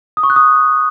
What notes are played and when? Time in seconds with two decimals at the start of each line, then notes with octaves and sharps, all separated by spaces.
0.17 D#6
0.23 C#6
0.30 F#6
0.36 D#6